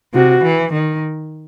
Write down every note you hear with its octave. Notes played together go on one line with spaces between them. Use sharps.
C3 F#4
E3
D#3